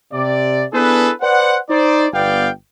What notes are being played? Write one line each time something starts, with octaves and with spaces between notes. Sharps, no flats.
C3 D5
B3 D4 E4 G#4 A4 B4
B4 C5 D5 F#5
D#4 C5 D5
G1 B3 B4 D5 F5 G5